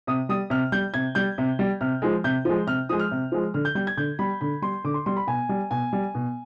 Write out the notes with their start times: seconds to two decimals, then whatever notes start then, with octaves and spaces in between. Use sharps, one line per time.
0.07 C3 D#6
0.29 G3 D#6
0.50 C3 F6
0.72 G3 G6
0.94 C3 G#6
1.15 G3 G6
1.38 C3
1.59 G3
1.81 C3 F6
2.02 F3 G#3
2.24 C3 G6
2.45 F3 G#3
2.67 C3 F6
2.89 F3 G#3 D#6
3.00 F6
3.11 C3
3.32 F3 G#3
3.54 D3 F6
3.65 G6
3.75 G3 G6
3.87 G#6
3.97 D3 G6
4.19 G3 B5
4.41 D3 B5
4.62 G3 C6
4.84 D3 D6
4.94 C6
5.06 G3 C6
5.17 B5
5.27 B2 G#5
5.49 G3
5.71 B2 G#5
5.93 G3
6.15 B2